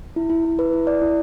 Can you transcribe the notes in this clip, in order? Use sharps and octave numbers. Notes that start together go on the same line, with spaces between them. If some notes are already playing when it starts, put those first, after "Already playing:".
E4
E4
E4
B4
E4
D5
E4